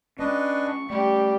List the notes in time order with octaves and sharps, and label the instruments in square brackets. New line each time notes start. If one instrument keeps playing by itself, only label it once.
[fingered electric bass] G#3 B3 C#4 [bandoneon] D4 B4 D#5 [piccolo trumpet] C#6
[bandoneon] G3 [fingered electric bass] A3 C#4 [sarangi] G4